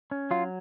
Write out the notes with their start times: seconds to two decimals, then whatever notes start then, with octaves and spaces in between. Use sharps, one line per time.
0.11 C#4
0.31 F#3 F4